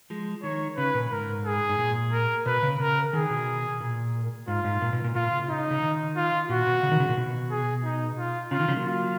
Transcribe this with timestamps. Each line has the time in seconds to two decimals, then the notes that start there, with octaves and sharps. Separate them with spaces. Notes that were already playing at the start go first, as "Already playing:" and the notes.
0.10 F3 G#3
0.43 D#3 C#5
0.77 C#3 B4
0.94 A#2
1.11 G#2 A#4
1.45 G#4
1.69 G#2
1.78 A#2
2.13 A#4
2.46 B2 B4
2.63 C#3
2.79 C#3 A#4
3.13 D#3 G#4
3.30 B2
3.80 A#2
4.48 G#2 F4
4.65 G#2
4.82 A#2
4.93 B2
5.04 A#2
5.15 A#2 F4
5.32 C#3
5.48 D#4
5.71 C#3
5.82 D#3
6.16 F4
6.49 A#2 F#4
6.67 B2
6.83 C#3
6.92 D#3
7.00 C#3
7.09 A#2
7.17 B2
7.51 G#4
7.84 D#4
8.18 F4
8.51 C#3 F4
8.60 D#3
8.68 C#3 F3
8.76 F#3 A#3
8.86 F4